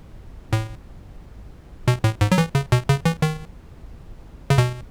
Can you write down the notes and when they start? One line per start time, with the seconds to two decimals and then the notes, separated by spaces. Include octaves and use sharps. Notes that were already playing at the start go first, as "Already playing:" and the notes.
0.53 A2
1.88 B2
2.04 A2
2.21 G#2
2.32 F#3
2.38 E3
2.55 C#3
2.72 B2
2.89 C#3
3.05 E3
3.22 D#3
4.50 C#3
4.58 B2